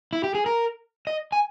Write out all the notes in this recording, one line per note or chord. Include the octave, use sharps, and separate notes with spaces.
E4
G4
G#4
A#4
D#5
G#5